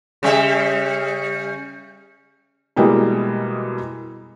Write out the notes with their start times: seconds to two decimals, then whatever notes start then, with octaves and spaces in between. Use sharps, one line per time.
0.23 C#3 G3 E5
2.76 B2 E3 G3 G#3 A#3